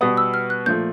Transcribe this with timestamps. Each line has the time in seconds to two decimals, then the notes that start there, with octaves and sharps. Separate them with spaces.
0.01 B2 G3 B3 D#6
0.17 E6
0.34 F6
0.50 F#6
0.66 A#2 F3 A3 G6